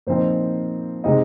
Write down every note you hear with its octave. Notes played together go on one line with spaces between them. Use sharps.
A#2 F3 C4 D#4 C5
C3 G#3 C4 D#4 D#5